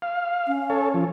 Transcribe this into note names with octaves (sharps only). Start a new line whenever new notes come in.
F5
C#4
A4 C#5
F3